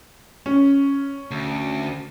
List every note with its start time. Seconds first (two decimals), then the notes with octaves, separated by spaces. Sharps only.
0.46 C#4
1.31 D2